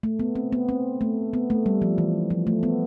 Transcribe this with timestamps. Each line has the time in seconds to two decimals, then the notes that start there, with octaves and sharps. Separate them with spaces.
0.03 A3
0.19 B3
0.35 C4
0.53 B3
0.69 C4
1.01 A3
1.34 B3
1.50 A3
1.66 G3
1.82 F3
1.98 E3
2.31 F3
2.47 A3
2.63 B3